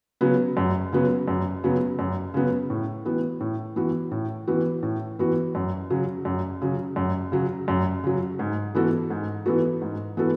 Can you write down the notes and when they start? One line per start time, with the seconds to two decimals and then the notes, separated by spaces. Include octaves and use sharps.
0.21 C#3 F#3 B3
0.57 F#2
0.93 C#3 F#3 B3
1.28 F#2
1.64 C#3 F#3 B3
1.99 F#2
2.34 C#3 F#3 B3
2.70 A2
3.05 E3 B3 F#4
3.40 A2
3.76 E3 B3 F#4
4.11 A2
4.47 E3 B3 F#4
4.83 A2
5.19 E3 B3 F#4
5.55 F#2
5.90 C#3 F#3
6.25 F#2
6.62 C#3 F#3
6.96 F#2
7.32 C#3 F#3
7.68 F#2
8.04 C#3 F#3
8.39 G#2
8.75 E3 B3 F#4 A4
9.10 G#2
9.45 E3 B3 F#4 A4
9.81 G#2
10.17 E3 B3 F#4 A4